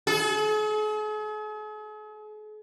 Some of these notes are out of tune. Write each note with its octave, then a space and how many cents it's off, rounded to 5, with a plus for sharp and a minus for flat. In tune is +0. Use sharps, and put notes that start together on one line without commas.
G#4 +45